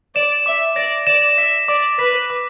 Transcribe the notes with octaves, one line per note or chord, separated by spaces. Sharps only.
D5 E7
E5 D6
D5 A#6
D5 E7
E5 B6
D5 D6
B4 B6
D6